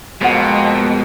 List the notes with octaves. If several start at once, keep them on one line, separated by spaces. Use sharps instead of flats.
F2 B2 G#3 A#3 C4 F#5 A6